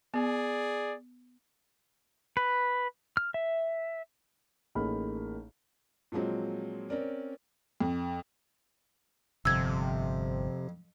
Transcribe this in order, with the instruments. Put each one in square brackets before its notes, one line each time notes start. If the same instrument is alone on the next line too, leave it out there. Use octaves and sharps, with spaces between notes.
[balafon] B3 [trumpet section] G#4 D5
[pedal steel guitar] B4
F6
E5
[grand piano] A1 A#3 D#4 G#4 B5 F6
[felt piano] A#2 F3 F#3 G#3 C4
C4 C#4 A#4 D5
[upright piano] F2
[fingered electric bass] G1 [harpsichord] F2 [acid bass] C3 [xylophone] E6 G#6